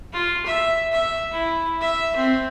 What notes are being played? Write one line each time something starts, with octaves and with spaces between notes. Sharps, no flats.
F4
E5
E5
E4
E5
C4